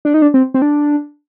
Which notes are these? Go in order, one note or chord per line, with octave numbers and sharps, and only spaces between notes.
D4
D#4
D4
C4
C4
D4